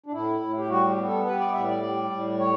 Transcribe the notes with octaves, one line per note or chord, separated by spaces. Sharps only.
D4
A2 E4
A2
G4
G3 F#4
G4
B3
A4
G3 B4
D5
A2 E5
D5
G3
A2
C#5